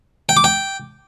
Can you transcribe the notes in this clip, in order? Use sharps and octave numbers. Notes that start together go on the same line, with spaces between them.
G5
D6
G5